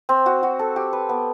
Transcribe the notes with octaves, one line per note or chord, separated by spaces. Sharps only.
C4
F#4
F#4
A4
G4
B4
B3